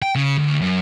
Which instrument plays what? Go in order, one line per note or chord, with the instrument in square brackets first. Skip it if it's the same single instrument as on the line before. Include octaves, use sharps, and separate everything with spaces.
[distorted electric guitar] G5
C#3
D2
F#2